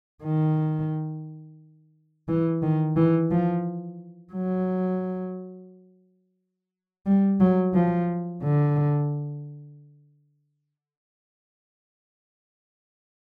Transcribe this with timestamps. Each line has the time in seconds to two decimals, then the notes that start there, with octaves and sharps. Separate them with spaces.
0.24 D#3
2.28 E3
2.62 D#3
2.97 E3
3.31 F3
4.33 F#3
7.06 G3
7.40 F#3
7.74 F3
8.43 D3